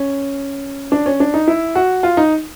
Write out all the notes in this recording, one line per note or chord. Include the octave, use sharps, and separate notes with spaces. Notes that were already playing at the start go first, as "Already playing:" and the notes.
Already playing: C#4
D4
C#4
D4
D#4
E4
F#4
F4
D#4